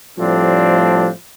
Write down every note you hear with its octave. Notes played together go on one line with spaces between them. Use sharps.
A2 F3 G3 A3 C4 D4